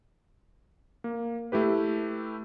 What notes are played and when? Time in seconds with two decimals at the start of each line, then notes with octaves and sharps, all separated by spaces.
1.04 A#3
1.52 A3 E4 G4 B4